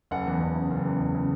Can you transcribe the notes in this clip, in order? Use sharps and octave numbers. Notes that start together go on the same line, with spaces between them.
F#1 F#5
E2
F#1
C#3
F#1
E2
F#1
C#3